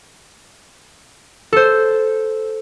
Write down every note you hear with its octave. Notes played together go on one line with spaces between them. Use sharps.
A4 C5